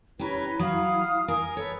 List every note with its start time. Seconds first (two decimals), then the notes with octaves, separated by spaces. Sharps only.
0.19 C#4 E4 G4 B4 C#5 A#5
0.59 F#3 F5 D#6
1.28 A#4 G#5
1.57 A4 B4 C#5